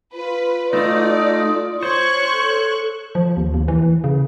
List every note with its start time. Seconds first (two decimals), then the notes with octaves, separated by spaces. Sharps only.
0.14 F4 B4
0.73 A3 D#4 D5 D#6
1.83 C5 C#5 C#6 F#6
2.32 A4
3.15 F3
3.37 D#2
3.54 D#2
3.68 E3
4.04 C#3